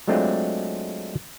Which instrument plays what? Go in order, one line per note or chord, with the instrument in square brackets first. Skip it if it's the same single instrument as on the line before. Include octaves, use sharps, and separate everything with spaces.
[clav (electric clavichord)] F#3 G#3 A3 C4 D4 F4